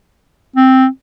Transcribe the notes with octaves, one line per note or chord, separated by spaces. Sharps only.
C4